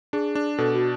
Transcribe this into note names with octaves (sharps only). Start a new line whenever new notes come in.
D4 G#4
D4
B2 A4
F#4